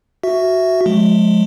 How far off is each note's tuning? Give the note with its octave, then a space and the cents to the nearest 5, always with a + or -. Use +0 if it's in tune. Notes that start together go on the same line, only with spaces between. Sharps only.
F#4 +0 E5 +0
F3 +45 G#3 +30